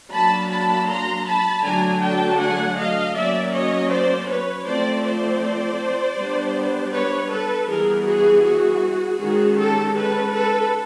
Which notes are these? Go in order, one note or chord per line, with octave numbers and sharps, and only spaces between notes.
F#3 A#3 D4 A5 B5
A5 B5
A#5 C6
A5 B5
D3 F#3 A3 D4 G#5 A#5
G5 A5
F#5 G#5
D#5 F5
F#3 A#3 C#4 D5 E5
C#5 D#5
C5 D5
B4 C#5
F3 A3 C4 C5 D5
C5 D5
G3 B3 D4
B4 C#5
A4 B4
E3 G3 B3 G#4 A#4
F#4 G#4
F#4 G#4
D#3 G#3 C#4 F#4 G#4
G4 A4
A4 B4
A4 B4